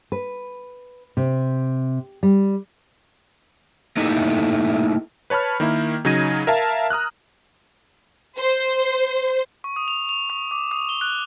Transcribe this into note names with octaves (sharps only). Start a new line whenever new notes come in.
B4
C3
G3
A3 A#3 D#4 E4 G4 A4
B4 C#5 A5 B5 F6
D#3 A#3 E4
C#3 F#3 D#4 G#6 A#6 D#7
A#4 E5 F5 A5
A#5 D#6 F6 F#6
C5
C#6
D#6
F7
F7
C#6
D6
D#6
G7
F#6